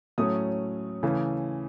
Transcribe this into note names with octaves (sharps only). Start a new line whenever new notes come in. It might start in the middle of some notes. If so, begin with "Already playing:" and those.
A2 F#3 A3 C#4 D#6
C#3 E3 A3